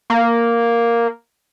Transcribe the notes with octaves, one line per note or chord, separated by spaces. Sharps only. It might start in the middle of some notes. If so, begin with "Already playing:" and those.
A#3